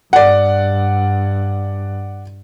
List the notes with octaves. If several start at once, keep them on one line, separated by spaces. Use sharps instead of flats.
G2 D5 F#5